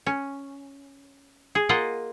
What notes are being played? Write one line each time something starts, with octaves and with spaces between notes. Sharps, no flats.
C#4
G#4
A#3 F4 D#5 F#5